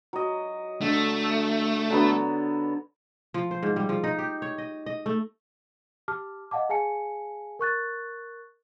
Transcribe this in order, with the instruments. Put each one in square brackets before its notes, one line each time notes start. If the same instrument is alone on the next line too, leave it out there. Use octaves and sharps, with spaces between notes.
[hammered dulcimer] F#3 D#5
[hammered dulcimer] D3 [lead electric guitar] A3
[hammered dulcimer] D3 F#3 B3
[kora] F3
C5
G#2
G3
F3
D#4
G4
C#5
D#5
D#5
A3
[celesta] G4 A5 D6 F6
D#5 F5 F#5 A5 D6
G#4 F5 G#5 A5 C#7
A#4 C#6 F#6 A6